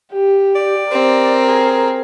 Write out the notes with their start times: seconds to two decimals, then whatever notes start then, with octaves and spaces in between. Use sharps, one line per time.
0.12 G4
0.55 D5
0.92 C4 A#4
1.48 G#4